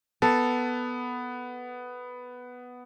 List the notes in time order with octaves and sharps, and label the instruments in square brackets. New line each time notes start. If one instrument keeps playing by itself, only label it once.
[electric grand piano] B3 [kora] A4